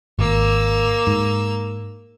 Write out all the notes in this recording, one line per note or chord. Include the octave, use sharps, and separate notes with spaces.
G#1 A#3 E6
G#2